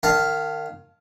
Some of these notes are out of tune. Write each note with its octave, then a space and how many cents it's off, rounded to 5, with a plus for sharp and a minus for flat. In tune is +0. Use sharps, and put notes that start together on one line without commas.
D#3 -25 F5 +0 A5 +0